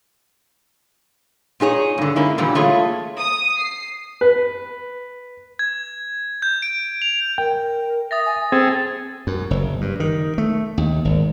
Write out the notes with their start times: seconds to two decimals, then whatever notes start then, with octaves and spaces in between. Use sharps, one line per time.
1.60 A#2 D#4 G#4 C#5
1.98 G2 D3
2.16 G#3 A#3 C#4 D#4 E4
2.38 A#2 D3 E3 G3
2.55 A3 A#3 F4 G#4 C#5
3.19 D#6
3.58 C7
4.21 B4
5.59 G#6
6.42 G6
6.62 D7
7.02 F7
7.38 A#4 G5
8.11 E5 D#6 A6 A#6
8.26 G#5
8.52 C4 G#4 A4 G5
9.27 F#2
9.51 F#1
9.81 G2
10.00 D#3
10.38 A3
10.78 D#2
11.05 G#1